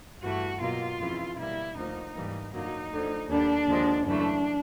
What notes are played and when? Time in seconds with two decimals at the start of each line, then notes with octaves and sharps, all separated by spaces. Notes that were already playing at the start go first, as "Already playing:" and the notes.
0.22 G2 E3 A3 F#4
0.61 B2 F#3 A#3 F4
0.99 F2 C#3 E3
1.37 B2 G3 A#3 E4
1.76 D2 D3 F3 A#3 D#4
2.14 G#2 E3 G3 A#3
2.52 F#2 D3 F#3 A#3 D#4
2.91 D2 D3 F3
3.29 D#2 D3 G3 D4
3.67 D#2 D3 F3 G#3
4.05 F#2 C#3 E3 A3 D4